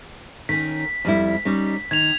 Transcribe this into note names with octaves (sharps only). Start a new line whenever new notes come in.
D#3 C#4 B6
F2 G3 E4
G3 C#4 D#4
D#3 G#6 F7